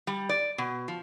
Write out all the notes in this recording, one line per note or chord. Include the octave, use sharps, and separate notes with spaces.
G3
D5
B2
F3